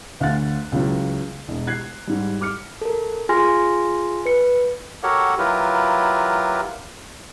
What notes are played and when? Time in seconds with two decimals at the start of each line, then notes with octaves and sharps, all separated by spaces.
0.20 D2 F5 F#5 F#6 A6
0.72 C#2 C#3 E3 F#3
1.48 E1
1.67 F#6 G#6 C7
2.07 G#2 G3
2.41 D6 F6 C#7
2.81 A4 A#4
3.29 F4 G#4 G#5 C6 F6 A#6
4.26 B4 C#7
5.03 F#4 G4 A4 A#4 C#5 F#5
5.38 F#3 E4 F4 G4 A#4 B4